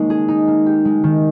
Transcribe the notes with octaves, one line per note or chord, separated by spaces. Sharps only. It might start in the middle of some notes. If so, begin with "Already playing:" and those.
Already playing: D#3 G#3 A#3 C#4 D#4
G#4
D#4
A#3
G4
G#3
D#3